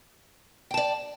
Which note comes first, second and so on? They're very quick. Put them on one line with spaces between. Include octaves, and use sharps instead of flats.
G5 A5 D5